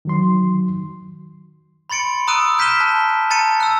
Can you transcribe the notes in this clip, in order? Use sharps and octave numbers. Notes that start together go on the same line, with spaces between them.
D#3 F#3 C6
B5 C6 A6 C#7 D7
A#5 D#6 E6 F#6 D7 D#7
F6 G6 B6 D#7 E7 G7
A5
A5 A#5 A6 C#7 D#7
E6 F#6